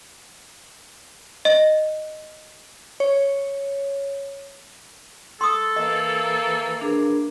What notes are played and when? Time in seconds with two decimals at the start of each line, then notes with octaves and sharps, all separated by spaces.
1.45 D#5
3.00 C#5
5.41 A4 C6 D#6
5.76 E3 A#3 D#5
6.81 D4 G#4 A#4